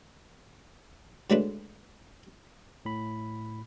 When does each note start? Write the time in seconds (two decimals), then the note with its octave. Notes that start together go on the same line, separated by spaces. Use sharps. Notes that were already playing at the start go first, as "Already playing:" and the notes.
1.30 D3 F#3 G#3 A3 D4 B4
2.85 A2 B5